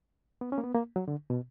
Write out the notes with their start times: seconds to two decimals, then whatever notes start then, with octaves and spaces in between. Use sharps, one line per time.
0.41 B3
0.52 C#4
0.58 A#3
0.64 B3
0.75 A#3
0.96 F#3
1.08 D3
1.30 B2